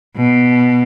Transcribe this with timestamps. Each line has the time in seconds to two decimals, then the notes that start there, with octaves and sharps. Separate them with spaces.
0.17 B2